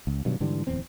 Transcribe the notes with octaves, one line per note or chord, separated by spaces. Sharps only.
C#2
G2 B2 D#3 F#3
G#2 D3 E3 G3
D1 E2 C4